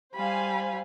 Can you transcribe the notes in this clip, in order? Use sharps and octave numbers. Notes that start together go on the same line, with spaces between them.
G3 C5 F5 G#5 B5